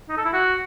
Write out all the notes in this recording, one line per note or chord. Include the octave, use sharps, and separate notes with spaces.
D#4
A4
E4
F#4